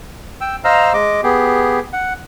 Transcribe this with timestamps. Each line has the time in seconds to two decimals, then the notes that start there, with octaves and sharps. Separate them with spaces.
0.41 G5 E6
0.64 C5 D#5 F5 A#5 E6 F6
0.94 G#3 D#5 D6
1.23 B3 G4 G#4
1.93 F#5